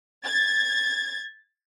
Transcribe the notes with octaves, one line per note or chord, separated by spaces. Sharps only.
G#6 A6